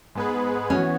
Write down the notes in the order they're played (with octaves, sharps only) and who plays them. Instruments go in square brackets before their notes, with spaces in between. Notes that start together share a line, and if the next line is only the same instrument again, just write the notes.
[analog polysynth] G#2 G#3 B3 G#4 B4
[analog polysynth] E3 B3 F#4 [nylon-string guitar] C#4